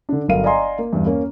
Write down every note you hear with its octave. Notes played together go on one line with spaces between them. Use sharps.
D3 D4
G1 F#3 A#4 F5 D#7
D5 D#5 F5 G#5 A#5 C6
A#3
E2 G2
A#3 C#4